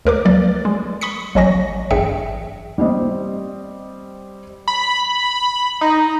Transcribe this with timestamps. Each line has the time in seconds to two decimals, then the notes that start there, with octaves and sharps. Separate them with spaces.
0.05 D2 A#4 B4 D6
0.25 F#3 A#3 D5
0.65 G#3
1.01 B5 C#6 D#6 B6 C#7
1.35 A1 F#3 D#5 G#5 C#6 A#6
1.91 A1 G2 G#4 E5 G5 C#7
2.78 G3 C4 D#5
4.68 B5
5.81 D#4